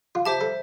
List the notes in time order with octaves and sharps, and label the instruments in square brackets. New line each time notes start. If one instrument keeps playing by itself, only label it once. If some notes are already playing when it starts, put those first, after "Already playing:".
[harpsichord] F4
[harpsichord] G4 [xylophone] C5 E5 A5
[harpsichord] A4